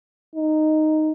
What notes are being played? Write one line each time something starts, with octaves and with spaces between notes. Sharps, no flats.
D#4